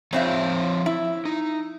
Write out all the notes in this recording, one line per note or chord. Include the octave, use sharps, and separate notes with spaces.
F2 F3 C4 C#5 E5 F5
E4
D#4